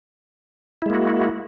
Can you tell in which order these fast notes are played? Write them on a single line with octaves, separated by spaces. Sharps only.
E4 G#3 A#3 F#4